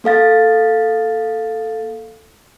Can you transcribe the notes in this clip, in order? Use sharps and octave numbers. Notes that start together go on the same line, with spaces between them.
A#3 A4 F5 A6